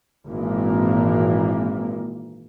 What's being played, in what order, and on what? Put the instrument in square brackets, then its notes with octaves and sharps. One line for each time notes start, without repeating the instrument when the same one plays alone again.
[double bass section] G#1 A#2 E3 A#3